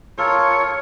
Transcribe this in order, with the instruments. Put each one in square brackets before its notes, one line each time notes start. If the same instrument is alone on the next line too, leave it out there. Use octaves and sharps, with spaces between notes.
[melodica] F4 A4 A#4 [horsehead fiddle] C#5